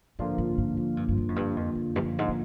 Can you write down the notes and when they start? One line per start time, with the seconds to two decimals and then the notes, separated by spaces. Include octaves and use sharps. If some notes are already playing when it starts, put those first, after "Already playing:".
0.19 G#2 D3 F3 A#3 D4 F4
0.38 G#2
0.58 G#2
0.77 G#2
0.97 G2
1.09 G2
1.18 G#2
1.29 F#2
1.36 G2
1.56 F2
1.75 F2
1.96 G2
2.02 F#2
2.19 G#2
2.29 A2